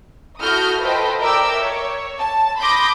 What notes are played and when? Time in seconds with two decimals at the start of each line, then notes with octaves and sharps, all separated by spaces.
0.39 E4 F#4 A4 D#6 F6 G6
0.81 F4 A4 B4 C5 D#5 G5
1.21 A#4 D5 E5 G5 D6 E6
1.59 C#5
2.18 A5
2.59 B5 C6 D6 D#6 G6 A#6